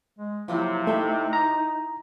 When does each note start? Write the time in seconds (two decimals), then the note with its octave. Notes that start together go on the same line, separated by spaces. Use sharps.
0.19 G#3
0.48 C3 F3 F#3 A#3 E4
0.87 A3 D#4 E5 G5 B5
1.33 A#5